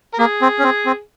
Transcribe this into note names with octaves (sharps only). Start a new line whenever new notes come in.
A#4
A#3 G#4
C4
C#4
C4
C4